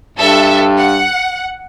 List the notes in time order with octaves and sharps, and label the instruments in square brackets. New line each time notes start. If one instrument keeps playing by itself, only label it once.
[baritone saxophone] G2 [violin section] A4 E5
[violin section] F#5